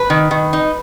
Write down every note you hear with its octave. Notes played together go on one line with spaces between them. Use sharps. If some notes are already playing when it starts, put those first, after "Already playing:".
Already playing: B4
D#3
D#3
D#4